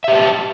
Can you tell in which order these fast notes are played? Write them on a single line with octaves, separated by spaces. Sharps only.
E5 G4 B4 A5